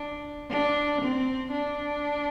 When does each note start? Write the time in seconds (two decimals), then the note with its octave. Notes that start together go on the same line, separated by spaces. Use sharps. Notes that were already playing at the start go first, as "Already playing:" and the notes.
Already playing: D4
0.50 D4
1.02 C4
1.52 D4